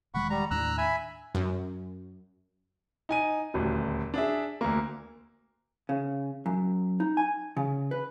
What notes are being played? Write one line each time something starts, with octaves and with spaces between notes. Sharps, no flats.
E1 D#3 G#3 F#5 B5 C#6
G3 A#5
D#2 A2 D4 A#5 E6 F#6
E5 G#5 B5
F#2
D#4 G#5 D#7
D#1 D2
D4 G#4 E5
D2 A#3
C#3
F#2
D#4
G#5
C#3
B4